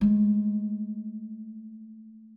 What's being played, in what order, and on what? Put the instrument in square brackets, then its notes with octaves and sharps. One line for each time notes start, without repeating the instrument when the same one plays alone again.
[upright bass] G#3 A3